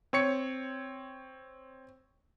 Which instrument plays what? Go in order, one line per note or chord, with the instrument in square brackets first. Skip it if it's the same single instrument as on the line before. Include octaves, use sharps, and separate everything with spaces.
[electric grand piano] C4 C#5 C#7